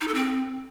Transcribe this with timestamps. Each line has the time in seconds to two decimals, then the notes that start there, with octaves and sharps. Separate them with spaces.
0.01 D#4
0.08 A4
0.14 C4